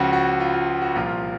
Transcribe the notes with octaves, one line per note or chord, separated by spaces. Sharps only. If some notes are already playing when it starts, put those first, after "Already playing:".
Already playing: C#2 C#3 F3 F#4
F#4
F4
F4
F#4
F#4
C2 A#2 F3 F4